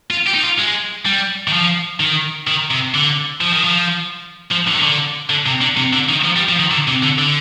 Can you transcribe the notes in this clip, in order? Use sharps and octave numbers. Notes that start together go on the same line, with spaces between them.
F4
G4
D#4
F4
G#3
G3
D#3
F3
D#3
D#3
C3
D3
F3
D#3
F3
F3
D3
D#3
D3
D3
C3
D3
C3
D3
D#3
F3
G3
F3
D#3
D3
C3
D3
D3